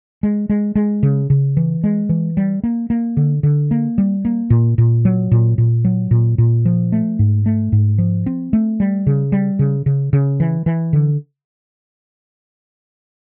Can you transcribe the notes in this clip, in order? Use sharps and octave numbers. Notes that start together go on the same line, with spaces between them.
G#3
G#3
G#3
C#3
C#3
E3
G#3
E3
G3
A#3
A#3
D3
D3
A#3
G3
A#3
A#2
A#2
F#3
A#2
A#2
F#3
A#2
A#2
F3
A3
G#2
A3
G#2
F3
C4
A3
G3
C#3
G3
C#3
C#3
C#3
E3
E3
D3